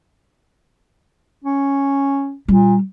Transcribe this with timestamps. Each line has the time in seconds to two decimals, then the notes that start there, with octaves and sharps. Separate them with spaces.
1.44 C#4
2.48 A#2 G3